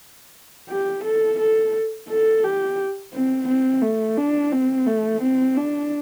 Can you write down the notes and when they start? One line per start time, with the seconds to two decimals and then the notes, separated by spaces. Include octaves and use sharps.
0.70 G4
1.04 A4
1.40 A4
2.09 A4
2.43 G4
3.13 C4
3.48 C4
3.82 A3
4.17 D4
4.52 C4
4.86 A3
5.21 C4
5.56 D4